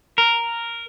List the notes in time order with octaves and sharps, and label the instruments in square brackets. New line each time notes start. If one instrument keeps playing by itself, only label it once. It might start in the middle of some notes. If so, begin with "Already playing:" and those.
[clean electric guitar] A#4